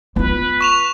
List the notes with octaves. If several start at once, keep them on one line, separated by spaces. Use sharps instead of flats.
B3 F4 B4
C#6 E7 F7